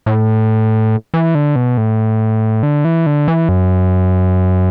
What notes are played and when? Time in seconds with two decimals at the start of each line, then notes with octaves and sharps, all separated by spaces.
0.06 A2
1.14 E3
1.35 D3
1.56 B2
1.78 A2
2.63 D3
2.85 E3
3.06 D3
3.28 E3
3.49 F#2